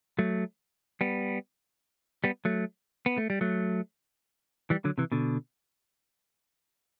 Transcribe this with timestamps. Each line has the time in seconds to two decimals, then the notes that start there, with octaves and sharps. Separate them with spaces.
0.19 F#3 A3
1.01 G3 B3
2.24 G3 B3
2.45 F#3 A3
3.06 B3
3.18 A3
3.30 G3
3.41 F#3 A3
4.70 E3 G3
4.85 D3 F#3
4.98 C3 E3
5.12 B2 D3